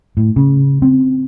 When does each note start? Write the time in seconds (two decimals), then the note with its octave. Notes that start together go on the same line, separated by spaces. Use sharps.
0.17 A2
0.36 C#3
0.82 C4